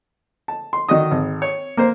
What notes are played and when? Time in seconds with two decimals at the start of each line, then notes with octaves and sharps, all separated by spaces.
0.48 A5
0.73 C6
0.89 D#3 F#4 D5 D#5 D#6
1.11 G#1
1.42 C#5
1.77 A#3 C5